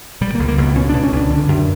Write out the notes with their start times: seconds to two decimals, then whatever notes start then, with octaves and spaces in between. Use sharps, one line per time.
0.21 B2 G3
0.35 A#3
0.39 C#2
0.48 A#3
0.58 C#2 B3
0.75 B2 C#4
0.89 B2 D4
1.03 C#4
1.12 C#2 D4
1.30 D3
1.48 F#2